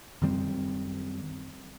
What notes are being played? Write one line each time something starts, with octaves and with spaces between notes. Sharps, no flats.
F#2 D#3 G3 C4